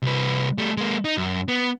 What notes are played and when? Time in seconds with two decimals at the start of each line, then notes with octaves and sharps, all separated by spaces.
0.02 C2 B4
0.58 G3 A3
0.77 G#3 A#3
1.05 D#4
1.18 F#2
1.48 B3